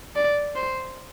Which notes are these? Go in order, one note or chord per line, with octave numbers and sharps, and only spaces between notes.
D5
C5